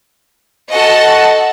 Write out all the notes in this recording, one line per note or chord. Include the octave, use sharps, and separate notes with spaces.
F#4 A4 D#5 F#5 A5